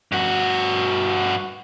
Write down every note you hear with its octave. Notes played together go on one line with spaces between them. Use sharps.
G2 F#4